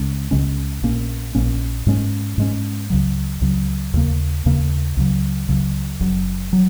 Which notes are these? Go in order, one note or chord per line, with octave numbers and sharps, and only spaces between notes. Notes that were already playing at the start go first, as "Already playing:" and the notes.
Already playing: C#2 C#3 G#3 C#4
C#2 C#3 G#3 C#4
A#1 A#2 A#3 C#4
A#1 A#2 A#3 C#4
G#2 G#3 C#4
G#2 G#3 C#4
C#2 C#3 F#3
C#2 C#3 F#3
D#2 C#3 A#3
D#2 C#3 A#3
C#2 C#3 F#3
C#2 C#3 F#3
F#1 F#2 F#3
F#3